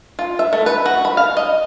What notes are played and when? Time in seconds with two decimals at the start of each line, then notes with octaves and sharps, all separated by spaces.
0.19 F4
0.39 E5
0.53 A3
0.66 B4
0.86 F#4
1.05 B5
1.17 F5
1.37 D#5